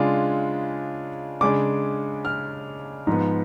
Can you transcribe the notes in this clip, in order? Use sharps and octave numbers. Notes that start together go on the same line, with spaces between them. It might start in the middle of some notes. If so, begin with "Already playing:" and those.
Already playing: C#3 G#3 D4 F4
C#3 G#3 D4 D6
F6
G#2 F3 B3